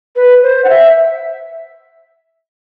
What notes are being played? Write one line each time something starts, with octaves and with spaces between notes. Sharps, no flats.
B4
C5
F#5
E5